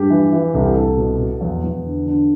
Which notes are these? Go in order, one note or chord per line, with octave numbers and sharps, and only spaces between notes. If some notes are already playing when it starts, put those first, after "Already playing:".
Already playing: G2 G4
E3
E3
C2 A4
G4
C2 A4
B2
B2
E2
E2
D3
D3